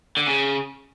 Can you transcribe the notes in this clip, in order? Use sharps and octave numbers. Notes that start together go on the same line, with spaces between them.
D3
C#3